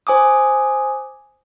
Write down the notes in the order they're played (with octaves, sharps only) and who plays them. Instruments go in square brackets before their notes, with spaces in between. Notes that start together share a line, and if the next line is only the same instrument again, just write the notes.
[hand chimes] C5 G#5 D6 D#6